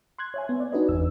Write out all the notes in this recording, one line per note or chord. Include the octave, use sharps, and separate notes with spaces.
C6 F#6 G#6
C#5 E5 G#5
B3
D5
D4 D#4 F#4 B4 D#5
G1 E2 E6